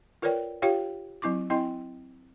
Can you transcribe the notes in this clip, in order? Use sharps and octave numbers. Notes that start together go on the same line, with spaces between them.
F4 A#4 B4 C#5 D5 G5
F4 G4 C#5 F5 G5
F#3 C4 E4 C#6 D6
C4 E4 D#5 G5 C6